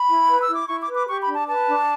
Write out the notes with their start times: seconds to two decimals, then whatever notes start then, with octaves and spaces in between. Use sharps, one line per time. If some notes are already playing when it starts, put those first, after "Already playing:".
Already playing: B5
0.08 E4
0.27 B4
0.41 E6
0.48 E4
0.55 D6
0.68 E4 C#6
0.82 D6
0.88 B4
0.94 D6
1.07 G4 C#6
1.21 B5
1.27 D4
1.34 A5
1.47 B4 A5
1.68 D4